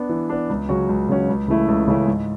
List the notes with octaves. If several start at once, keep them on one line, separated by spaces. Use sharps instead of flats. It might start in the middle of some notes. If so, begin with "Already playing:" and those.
Already playing: B3 D4
E3
B3 D4
C#2
C#3 F#3 C#4 F#4
C#2
C#3 F#3 C#4 F#4
C#2
C#3 E3 A3 E4
C#2
C#3 E3 A3 E4
G#2